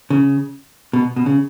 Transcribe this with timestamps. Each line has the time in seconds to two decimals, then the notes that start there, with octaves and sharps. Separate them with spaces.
0.10 C#3
0.93 B2
1.16 B2
1.26 C#3